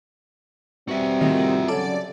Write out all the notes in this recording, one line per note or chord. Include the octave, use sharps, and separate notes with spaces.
B2 G3 C4 F#4 E5
A2 C3 D#3 F3
C#3 F#3 A4 D5